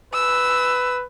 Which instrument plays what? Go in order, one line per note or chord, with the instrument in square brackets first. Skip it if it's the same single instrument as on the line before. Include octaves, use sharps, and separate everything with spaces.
[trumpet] B4 [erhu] E6